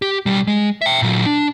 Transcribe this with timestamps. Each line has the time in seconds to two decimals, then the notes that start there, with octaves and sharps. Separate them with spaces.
0.02 G4
0.26 B1 G3
0.47 G#3
0.82 E5 G5
1.02 A#2 F#3
1.26 D4